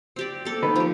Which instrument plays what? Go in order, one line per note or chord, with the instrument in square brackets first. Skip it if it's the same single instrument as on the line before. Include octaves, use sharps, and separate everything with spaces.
[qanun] C4 G4 D5
A#3 A4
[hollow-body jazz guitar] D3 D#3 B4
[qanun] F3 G4